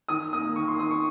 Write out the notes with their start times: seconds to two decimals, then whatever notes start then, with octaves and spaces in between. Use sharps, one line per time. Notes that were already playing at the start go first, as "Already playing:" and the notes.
0.09 D#3 D#6
0.33 A#3 D#6
0.56 D#3 C#6
0.68 C6
0.79 D#3 D#6
0.91 C#6